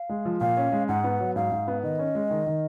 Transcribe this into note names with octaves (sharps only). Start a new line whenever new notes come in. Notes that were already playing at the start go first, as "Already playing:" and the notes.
Already playing: F5
G#3
F3
A#2 F5
C#4
G#3
G#2 F#5
B3
F#3
G#2 F5
G#2
B3
D#3 D#5
C#4
G#3
D#3
D#3